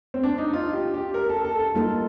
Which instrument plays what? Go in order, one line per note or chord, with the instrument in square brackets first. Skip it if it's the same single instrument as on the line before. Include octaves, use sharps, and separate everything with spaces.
[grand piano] C4
D4
D#4
F4
G4
G4
A#4
A4
A4
A4
[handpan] G3 A#3 D#4 A4 [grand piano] F4